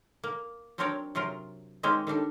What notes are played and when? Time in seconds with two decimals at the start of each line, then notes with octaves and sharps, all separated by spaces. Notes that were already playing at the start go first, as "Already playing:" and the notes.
0.24 A#3
0.78 F#3 C4 D4 A#4 C#5 D5
1.15 C3 F#3 F4 A#4
1.83 D#3 G#3 A#3 C4 C#4
2.07 D#3 G3 D4 A4